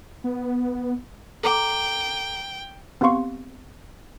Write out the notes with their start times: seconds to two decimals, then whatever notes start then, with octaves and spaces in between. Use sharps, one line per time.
0.24 B3
1.43 A4 G5 A#5 D6
3.01 B3 C4 G4 F5 C6 C#6